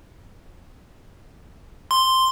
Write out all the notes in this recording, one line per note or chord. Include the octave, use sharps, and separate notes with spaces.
C6